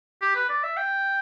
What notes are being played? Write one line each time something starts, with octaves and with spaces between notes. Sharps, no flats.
G4
B4
D5
E5
G5